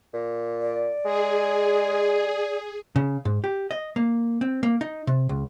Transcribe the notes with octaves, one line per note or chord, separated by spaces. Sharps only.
A#2
D5
G#3 G#4
C#3
G#2
G4
D#5
A#3
C4
A#3
D#4
C3
C#2